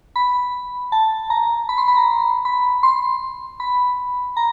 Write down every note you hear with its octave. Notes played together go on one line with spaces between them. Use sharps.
B5
A5
A#5
B5
C6
B5
A#5
B5
C6
B5
A#5